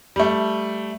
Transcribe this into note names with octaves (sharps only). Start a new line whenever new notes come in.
G3 A3